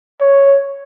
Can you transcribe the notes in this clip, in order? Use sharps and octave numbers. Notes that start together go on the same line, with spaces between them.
C#5